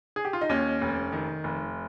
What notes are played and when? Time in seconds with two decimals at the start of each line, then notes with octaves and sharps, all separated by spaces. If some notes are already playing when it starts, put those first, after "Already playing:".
0.16 G#4
0.25 G4
0.33 F4
0.41 D#4
0.49 D#2 C#4
0.81 F1
1.13 D#3
1.44 F1